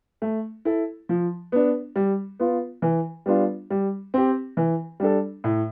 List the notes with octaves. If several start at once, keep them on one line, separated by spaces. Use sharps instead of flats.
A3
E4 A4
F3
B3 D4
G3
B3 F4
E3
G3 B3 D4 F4
G3
C4 G4
E3
G3 D4 A4
A2